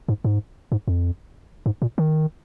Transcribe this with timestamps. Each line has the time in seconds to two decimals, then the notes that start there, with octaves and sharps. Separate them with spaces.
0.08 G#2
0.24 G#2
0.72 G#2
0.88 F2
1.66 G#2
1.82 A#2
1.98 D#3